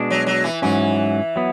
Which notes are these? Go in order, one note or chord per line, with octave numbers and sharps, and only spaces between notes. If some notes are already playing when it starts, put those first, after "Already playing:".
Already playing: B2 G#3 D4
F#3
F#3
E3
G#2 E3 F#3 C#4
F#3 B3